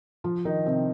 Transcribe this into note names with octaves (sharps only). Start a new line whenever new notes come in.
F3 F4
D#3 D#4
C3 C4